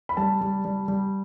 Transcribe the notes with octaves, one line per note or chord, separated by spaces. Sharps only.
B5
G3 A5
G3
G3
G3